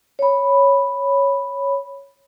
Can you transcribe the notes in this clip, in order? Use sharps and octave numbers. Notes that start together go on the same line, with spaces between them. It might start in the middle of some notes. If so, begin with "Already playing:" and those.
C#5 B5